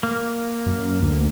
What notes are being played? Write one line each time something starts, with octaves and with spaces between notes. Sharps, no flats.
A#3
F#2
D2